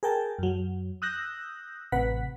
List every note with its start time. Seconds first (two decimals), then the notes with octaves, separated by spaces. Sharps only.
0.03 G#4 A#4 G5 A5
0.39 F#2 F#3
1.02 D#6 E6 F#6 G6 A#6
1.92 A1 C3 B4 F#5 B6